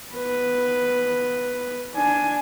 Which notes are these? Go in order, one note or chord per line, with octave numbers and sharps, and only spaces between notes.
B3 B4
D4 G#5